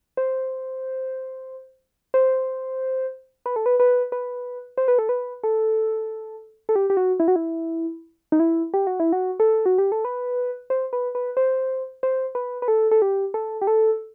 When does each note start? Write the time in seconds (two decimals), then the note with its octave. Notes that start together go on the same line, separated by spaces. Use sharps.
0.17 C5
2.14 C5
3.46 B4
3.56 A4
3.66 B4
3.80 B4
4.12 B4
4.78 C5
4.88 B4
4.99 A4
5.09 B4
5.44 A4
6.69 A4
6.76 G4
6.90 G4
6.97 F#4
7.20 E4
7.28 F#4
7.36 E4
8.32 D#4
8.40 E4
8.74 G4
8.87 F#4
9.00 E4
9.13 F#4
9.40 A4
9.66 F#4
9.78 G4
9.92 A4
10.05 B4
10.70 C5
10.93 B4
11.15 B4
11.37 C5
12.03 C5
12.35 B4
12.62 B4
12.68 A4
12.91 A4
13.02 G4
13.34 A4
13.62 G4
13.67 A4